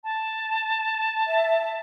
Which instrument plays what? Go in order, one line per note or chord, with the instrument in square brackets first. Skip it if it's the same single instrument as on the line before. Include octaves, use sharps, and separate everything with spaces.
[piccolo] A5
[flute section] E5